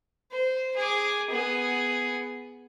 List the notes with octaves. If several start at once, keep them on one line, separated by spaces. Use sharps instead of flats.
C5
G#4 D6
B3 G#4